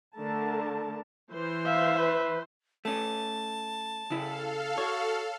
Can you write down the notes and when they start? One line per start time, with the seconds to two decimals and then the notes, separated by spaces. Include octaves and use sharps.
0.15 D3 A3 A#4 A5
1.31 E3 C5
1.66 E5 F5
1.99 B4
2.85 A3 C#4 A5
4.10 C#3 E4 A4 F5
4.78 F#4 C#5